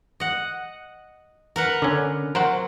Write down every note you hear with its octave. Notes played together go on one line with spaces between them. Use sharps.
D#5 F#5
A#4 B4 F#5
D3 C#4
F#3 A#4 C5 F#5